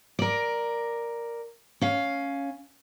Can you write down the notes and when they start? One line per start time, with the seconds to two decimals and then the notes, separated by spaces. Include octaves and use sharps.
0.19 A#4 D5
1.81 C#4 F5